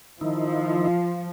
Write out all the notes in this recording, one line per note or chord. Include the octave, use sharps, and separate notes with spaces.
D#3 F3 D#4 E4